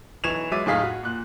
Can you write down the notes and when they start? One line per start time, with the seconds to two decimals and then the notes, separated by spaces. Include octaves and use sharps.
0.24 B1 E3 C#6 G#6 E7 F7
0.52 F#3 G#3 E5 D6 A6 D#7
0.66 F#1 A2 D#4 G#4 F5 B6
0.83 F#4
1.03 A#2 F#6